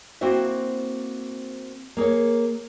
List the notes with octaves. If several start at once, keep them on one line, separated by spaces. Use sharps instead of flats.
A#3 C4 E4 F#4 C5 E5
A#3 G#4 A#4 C#5